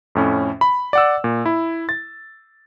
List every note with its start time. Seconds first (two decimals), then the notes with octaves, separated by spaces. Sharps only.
0.15 F2 A2 C#4
0.61 B5
0.93 D5 F#5 E6
1.24 A#2
1.46 E4
1.89 A6